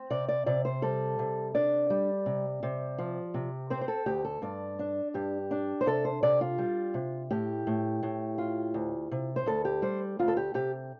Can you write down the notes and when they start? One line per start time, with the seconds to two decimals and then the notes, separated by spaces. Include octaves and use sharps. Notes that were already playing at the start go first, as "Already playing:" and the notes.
Already playing: C4
0.10 C3 D5
0.28 D5
0.46 C3 D5
0.65 C5
0.82 G3 A4
1.19 C3
1.55 D4 D5
1.90 G3
2.26 C3
2.63 C3
2.98 F3
3.34 C3
3.70 C4 C5
3.81 C5
3.88 A4
4.06 D2 G4
4.25 A4
4.42 G2 D5
4.79 D4
5.14 G2 G4
5.51 D4
5.81 C5
5.86 C3 A4
6.05 C5
6.23 C3 D5
6.41 F4
6.58 G3
6.94 C3
7.31 A2 G4
7.67 A2
8.03 A2
8.38 F4
8.74 D2
9.11 C3
9.36 C5
9.46 D2 A4
9.65 G4
9.82 G3 C5
10.19 D2 F4
10.28 A4
10.37 G4
10.54 C3 G4